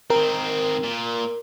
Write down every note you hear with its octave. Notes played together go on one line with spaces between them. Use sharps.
D#3 C4 A#4
A#2